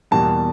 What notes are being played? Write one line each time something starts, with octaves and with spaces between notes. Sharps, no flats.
E2 B2 G3 A#3 A5